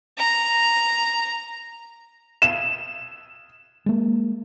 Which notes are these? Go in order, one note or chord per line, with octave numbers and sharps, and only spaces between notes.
A#5
E7
G#3 A#3